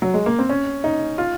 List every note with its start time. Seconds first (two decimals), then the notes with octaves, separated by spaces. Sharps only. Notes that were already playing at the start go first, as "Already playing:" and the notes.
0.02 F#3
0.14 G#3
0.26 A#3
0.39 C4
0.49 C#4
0.84 D#4
1.18 F4